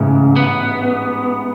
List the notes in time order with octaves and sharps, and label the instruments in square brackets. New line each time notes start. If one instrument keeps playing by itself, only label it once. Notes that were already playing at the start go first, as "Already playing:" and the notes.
Already playing: [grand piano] A1 G#2 E3 A3 [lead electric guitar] C#3
[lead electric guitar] B3